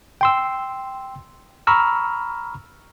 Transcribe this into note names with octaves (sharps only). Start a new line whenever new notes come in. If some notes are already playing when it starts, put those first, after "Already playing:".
G5 C6 E6
A#5 B5 C#6 E6 F6